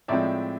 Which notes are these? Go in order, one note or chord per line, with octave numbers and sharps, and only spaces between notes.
A2 F3 G#3 C4 D5 E5